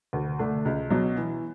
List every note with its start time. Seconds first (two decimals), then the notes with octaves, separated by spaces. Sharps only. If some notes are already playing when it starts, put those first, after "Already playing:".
0.13 D2
0.39 D3 A3 D4
0.65 C#2
0.90 B2 F#3
1.17 E3